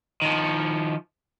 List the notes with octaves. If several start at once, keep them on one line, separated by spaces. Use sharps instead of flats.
D#3 F3